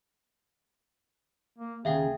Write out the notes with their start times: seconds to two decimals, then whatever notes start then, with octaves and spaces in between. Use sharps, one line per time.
1.58 A#3
1.85 D#2 C#3 G#4 E5 F5 G5